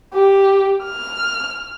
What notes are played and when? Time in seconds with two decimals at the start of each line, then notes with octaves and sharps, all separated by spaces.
0.14 G4
0.83 F6